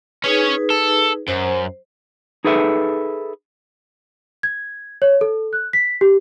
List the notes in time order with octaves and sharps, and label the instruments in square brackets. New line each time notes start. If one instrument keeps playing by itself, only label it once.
[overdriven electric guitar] C#4 C#5 [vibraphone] D#4 G#4 B4
[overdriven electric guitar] A4
[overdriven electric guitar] F#2 [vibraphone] C5
[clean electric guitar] D#4 G#4 A4 B4 E5
[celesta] G#6
C#5
A4
F#6
B6
G4